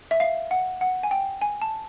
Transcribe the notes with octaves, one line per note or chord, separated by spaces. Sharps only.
E5
F5
F#5
F#5
G#5
G5
G#5
A5